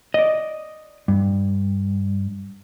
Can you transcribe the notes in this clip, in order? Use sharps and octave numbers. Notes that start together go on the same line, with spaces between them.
D5 D#5
G2